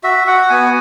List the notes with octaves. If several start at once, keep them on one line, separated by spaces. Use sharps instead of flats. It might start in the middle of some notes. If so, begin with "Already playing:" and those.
F#4 E5
F#4 F#5
B3 G#5